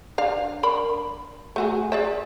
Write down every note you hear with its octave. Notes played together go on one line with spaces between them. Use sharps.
D4 F5
D4 A#4 B5
A3 F#4 G#4
G#4 D5 E5